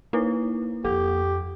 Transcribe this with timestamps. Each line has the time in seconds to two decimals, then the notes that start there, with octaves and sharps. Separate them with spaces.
0.13 A#3 D#4 E4 B4
0.84 F2 G4 A4